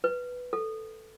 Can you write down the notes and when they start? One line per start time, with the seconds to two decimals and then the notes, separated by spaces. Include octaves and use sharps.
0.04 B4
0.53 A4